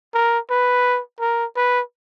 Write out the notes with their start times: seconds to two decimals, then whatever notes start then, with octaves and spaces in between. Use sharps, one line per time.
0.14 A#4
0.50 B4
1.20 A#4
1.56 B4